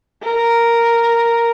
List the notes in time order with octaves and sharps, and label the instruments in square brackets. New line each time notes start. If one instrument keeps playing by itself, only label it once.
[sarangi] A#4